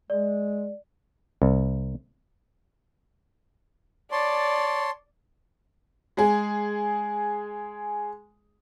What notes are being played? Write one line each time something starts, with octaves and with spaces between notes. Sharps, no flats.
G#3 D5
C2
C#5 D5 A5 C6
G#3 G#4